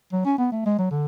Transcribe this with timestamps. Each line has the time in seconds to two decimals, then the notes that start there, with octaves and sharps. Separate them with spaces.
0.13 F#3
0.25 C#4
0.38 B3
0.52 A3
0.66 G#3
0.78 F#3
0.91 D3